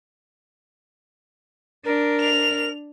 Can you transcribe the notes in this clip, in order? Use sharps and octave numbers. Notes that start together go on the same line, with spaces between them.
D4 A#4
F7